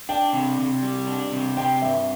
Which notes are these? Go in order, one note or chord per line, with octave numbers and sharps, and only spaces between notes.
D4 G5
C3
C3
G3
D4
C3
C4 G5
G2 E5